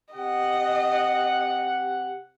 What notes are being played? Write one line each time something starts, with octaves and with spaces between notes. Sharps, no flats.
C3 G4 D#5 F#5